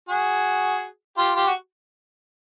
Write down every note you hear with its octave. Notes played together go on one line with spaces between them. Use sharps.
F#4 G#4
F4 G4
F4 G4
F#4